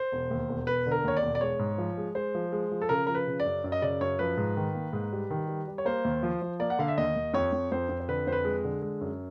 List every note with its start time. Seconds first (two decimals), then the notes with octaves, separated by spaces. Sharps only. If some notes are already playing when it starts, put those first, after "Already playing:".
Already playing: C5
0.12 E1
0.31 D#2
0.49 E1
0.67 E1 B4
0.86 D3 A#4
1.04 D#2 C#5
1.17 D5
1.22 E1
1.35 D5
1.41 G#3 C#5
1.59 G#2
1.78 F3
1.98 G#3
2.15 G#3 C5
2.35 F3
2.52 G#3
2.72 F3
2.82 A4
2.89 C#3 A#4
3.07 F3 A#4
3.15 B4
3.27 C#3
3.40 D5
3.45 F#2
3.64 F#2
3.72 D#5
3.82 C#3 D5
4.01 F#2 C#5
4.19 F3 B4
4.37 G#2
4.57 D#3
4.74 A#3
4.93 G#2
5.12 G3
5.30 D#3
5.48 G3
5.68 G3
5.78 C#5
5.85 A#3 C5
6.05 D#2
6.23 F3
6.42 F3
6.59 A#3 D5
6.70 F#5
6.79 D3 F5
6.88 E5
6.97 D#2 D#5
7.16 D#2
7.34 F2 C#5
7.52 F2
7.72 F2 C5
7.89 F2
8.00 C5
8.08 D3 B4
8.27 F2 C5
8.32 B4
8.45 G#3
8.64 D3
8.82 G#3
9.01 F#2